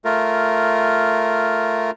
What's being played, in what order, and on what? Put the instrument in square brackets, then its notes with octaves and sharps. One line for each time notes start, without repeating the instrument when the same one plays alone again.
[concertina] A3 F4 A#4